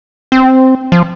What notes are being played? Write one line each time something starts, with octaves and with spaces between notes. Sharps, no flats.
C4
F3